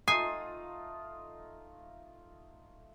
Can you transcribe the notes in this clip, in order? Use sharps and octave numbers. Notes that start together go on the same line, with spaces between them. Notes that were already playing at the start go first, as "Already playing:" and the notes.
A3 D#4 F4 G#5 D#6 C7